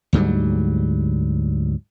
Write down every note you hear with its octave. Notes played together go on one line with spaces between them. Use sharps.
D2 G#2 F#3 G3